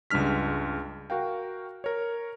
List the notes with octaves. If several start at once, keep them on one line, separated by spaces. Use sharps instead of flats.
C#2 G2 G#3 D4 F6 B6
F#4 A#4 F5 G5
A#4 C#5